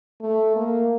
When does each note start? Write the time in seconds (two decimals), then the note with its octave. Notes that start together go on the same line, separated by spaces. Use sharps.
0.21 A3
0.56 A#3